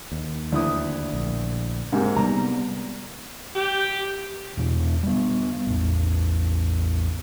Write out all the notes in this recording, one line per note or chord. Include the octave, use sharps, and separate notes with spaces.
D#2
D2 E4 D#6
A#1
G#2 C3 A#3
C3 G3 B3 A#5
G4
E2 B2
G3 B3
A1 E2